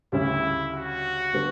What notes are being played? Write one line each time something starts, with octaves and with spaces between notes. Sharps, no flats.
D2 C#3 G3 C#4 E4
F#4
D3 G3 B3